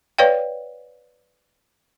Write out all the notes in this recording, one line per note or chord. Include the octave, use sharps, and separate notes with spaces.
B4 C#5 D5 F5 G5